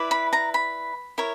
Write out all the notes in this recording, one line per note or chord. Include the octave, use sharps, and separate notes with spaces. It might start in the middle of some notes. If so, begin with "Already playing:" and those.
Already playing: E4 B4 D5
B5
A#5
B5
E4 A#4 C#5